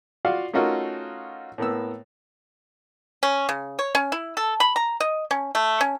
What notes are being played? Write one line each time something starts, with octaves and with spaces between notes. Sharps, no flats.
F4 F#4 D5 F5 F#5
A3 C#4 D#4 F4 F#4 A#4
A2 A#3 B3 E6
C#4
C#3
C#5
C#4
E4
A4
B5
A#5
D#5
C#4
A3
C#4